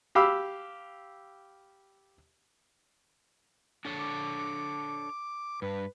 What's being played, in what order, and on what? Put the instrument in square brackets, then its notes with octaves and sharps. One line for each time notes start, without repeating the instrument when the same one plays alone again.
[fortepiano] G4 F5 B5 D6 E6
[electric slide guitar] D4 A4 C#5
[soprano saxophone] D6
[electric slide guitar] G2 [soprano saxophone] B4